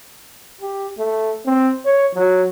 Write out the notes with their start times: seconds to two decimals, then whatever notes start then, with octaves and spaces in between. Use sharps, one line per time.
0.61 G4
0.98 A3
1.47 C4
1.85 C#5
2.15 F#3